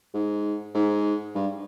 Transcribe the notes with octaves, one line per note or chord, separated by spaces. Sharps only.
G#2
G#2
G2